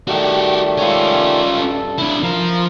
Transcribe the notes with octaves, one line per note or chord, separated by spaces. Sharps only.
D#3 G3 A3 F#4 G4
C#4 F4
G2 A4
D4 E4
F3 A#4